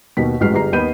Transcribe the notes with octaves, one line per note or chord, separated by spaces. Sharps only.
D#2 B2 B6
A1 F#3 G#3 F6 C7
G1 G4 G#4 A#5 C7
D#2 B3 D#5 B5 G6 D#7